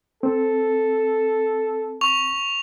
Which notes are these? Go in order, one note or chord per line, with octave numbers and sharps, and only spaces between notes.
C4 A4
C#6 F7